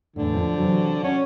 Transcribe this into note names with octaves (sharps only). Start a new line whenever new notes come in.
E2 A2 D3
F3 D4
C3 E3 F#3
C#4 F#5